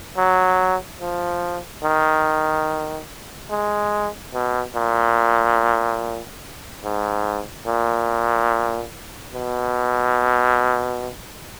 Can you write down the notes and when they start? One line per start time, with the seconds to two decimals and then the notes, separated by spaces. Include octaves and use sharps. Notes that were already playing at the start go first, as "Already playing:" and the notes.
0.17 F#3
1.01 F3
1.84 D#3
3.51 G#3
4.34 B2
4.75 A#2
6.84 G#2
7.67 A#2
9.34 B2